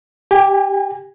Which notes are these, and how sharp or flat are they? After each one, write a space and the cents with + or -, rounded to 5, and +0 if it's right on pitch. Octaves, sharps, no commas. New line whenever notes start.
G4 +0 G#5 -35